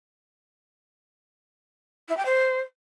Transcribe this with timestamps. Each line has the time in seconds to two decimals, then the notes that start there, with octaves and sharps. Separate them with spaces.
2.08 E4
2.17 G5
2.26 C5